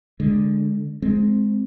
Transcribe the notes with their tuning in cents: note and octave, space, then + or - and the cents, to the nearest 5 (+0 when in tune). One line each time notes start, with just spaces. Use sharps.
D3 +0 G#3 -5
G#3 +15 C4 +0